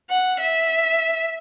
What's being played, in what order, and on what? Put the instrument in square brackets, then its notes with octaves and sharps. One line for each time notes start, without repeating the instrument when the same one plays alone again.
[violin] F#5
E5